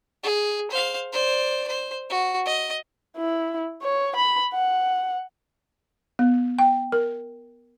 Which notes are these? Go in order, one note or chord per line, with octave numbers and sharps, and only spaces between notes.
G#4
C5 F5
C5 D5
C5
F#4
D#5
E4
C#5
B5
F#5
B3
G5
A#4